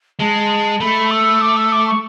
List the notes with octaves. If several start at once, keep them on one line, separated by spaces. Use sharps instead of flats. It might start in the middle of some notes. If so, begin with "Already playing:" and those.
G#3 A5
A3 B5
E6
D6
E6
D6
C#6